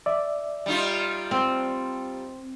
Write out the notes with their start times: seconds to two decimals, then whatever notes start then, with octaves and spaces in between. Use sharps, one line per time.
0.06 D5 E5
0.66 G3 D#4 F4
1.31 C4